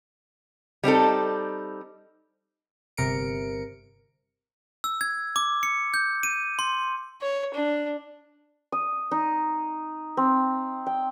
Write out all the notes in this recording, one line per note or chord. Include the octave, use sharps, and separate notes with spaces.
G3 C4 D#4 A4
G1 C3 A#4 C#7 D7
E6
G#6
D6
C#7
G6
D#7
C6
C#5
D4
D#6
D#4
C4
G5